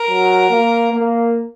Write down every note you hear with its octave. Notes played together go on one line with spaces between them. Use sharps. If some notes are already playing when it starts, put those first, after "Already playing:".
Already playing: A#4
F#3
A#3
A#3